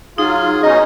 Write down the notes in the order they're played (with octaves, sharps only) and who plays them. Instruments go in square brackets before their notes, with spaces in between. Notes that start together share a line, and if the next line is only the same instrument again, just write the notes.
[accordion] F#3 F4 [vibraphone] D#4 [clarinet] G#4
[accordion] B2 C#4 D#4 [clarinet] D#5